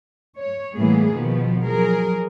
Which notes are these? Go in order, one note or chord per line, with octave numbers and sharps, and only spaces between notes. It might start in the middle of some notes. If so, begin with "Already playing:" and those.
C#5
A2 E3 G3 A#3 B3 G#4
B2 D#3 F3 B3
F3 F#3 G#4 A#4